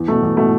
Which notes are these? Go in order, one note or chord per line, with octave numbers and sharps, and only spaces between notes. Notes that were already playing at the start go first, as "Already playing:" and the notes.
Already playing: E2
B2 A3
E2
B2 A3